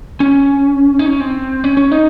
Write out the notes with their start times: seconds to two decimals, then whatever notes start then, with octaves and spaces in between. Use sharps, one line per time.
0.20 C#4
0.99 D#4
1.06 C#4
1.20 C4
1.64 C#4
1.77 C#4
1.92 D#4